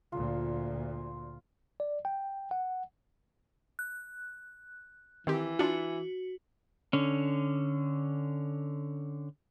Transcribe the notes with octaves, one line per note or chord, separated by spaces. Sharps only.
D2 A#2 F4
D5
G5
F#5
F#6
D#3 E3 C4 G4
D4 F4 F#4
D3 C#4